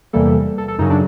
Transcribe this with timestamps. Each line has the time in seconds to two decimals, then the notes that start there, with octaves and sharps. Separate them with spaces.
0.13 E2 C3 E3 G3 A#3 A4
0.58 A4
0.68 A4
0.78 F#2 C#3 F#3 D#4
0.90 D4